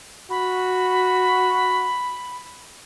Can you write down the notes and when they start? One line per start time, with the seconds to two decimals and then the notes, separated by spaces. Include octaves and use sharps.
0.30 F#4 B5